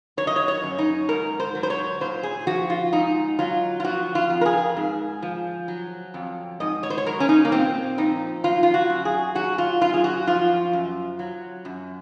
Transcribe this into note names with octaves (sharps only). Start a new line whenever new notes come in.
F#3 C#5
D#5
C#5
C#5
F#2
D#4
G#2 A#4
C5
F#3
C5
C#5
A#2 C5
G#4
F3 F#4
F4
G#2 D#4
F#3 F4
F4
F3 F#4
F4
F2
A#4
G#4
G#2
F3
F#3
F2
G#2 D#5
C#5
C5
C#5
F#3 A#4
C#4
D#4
A#3
A#2 C4
F3 D#4
F#3 F4
F4
F#4
F#2
G#4
F#3 F#4
F4
F#2 F4
G#4
F#4
F3 F4
F#2
F#3
F#2